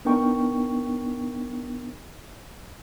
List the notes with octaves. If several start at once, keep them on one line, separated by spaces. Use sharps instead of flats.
B3 D4 D#4 A#4 G5 C#6